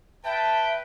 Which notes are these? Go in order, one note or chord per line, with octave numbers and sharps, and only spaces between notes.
B4 E5 G5 A5